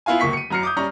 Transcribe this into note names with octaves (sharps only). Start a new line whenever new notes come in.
B3 E4 F4 F5 G#5
D1 C#2 A#3 C#6 B6
C#7 D#7
A1 F#2 A#5 F6 C7 C#7
D6 D#6 G6
G3 C#4 A#5 C#6